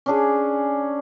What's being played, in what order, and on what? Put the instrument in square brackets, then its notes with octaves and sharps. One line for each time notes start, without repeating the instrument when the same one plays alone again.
[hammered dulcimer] C#4 D4 G#4